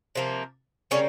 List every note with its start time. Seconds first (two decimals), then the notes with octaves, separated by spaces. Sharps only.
0.15 C3 F3 A#3
0.91 C#3 G3 A#3 C#4